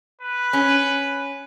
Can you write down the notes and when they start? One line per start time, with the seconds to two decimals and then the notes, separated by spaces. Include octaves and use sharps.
0.21 B4
0.53 C#4